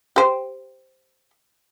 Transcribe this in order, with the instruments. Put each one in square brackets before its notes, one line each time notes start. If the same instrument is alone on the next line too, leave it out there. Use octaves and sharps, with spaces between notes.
[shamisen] G4 C5